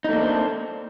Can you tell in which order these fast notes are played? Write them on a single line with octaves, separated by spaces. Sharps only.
D#4 A3 A#3 D4 C4